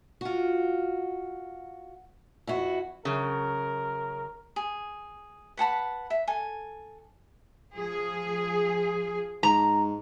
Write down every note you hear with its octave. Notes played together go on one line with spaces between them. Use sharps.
F4 F#4
F2 E4 F#4
F#2 C#3 A#4
G#4
B4 F#5 A5 B5
E5
A4 G#5
F3 G#4
G#2 A#5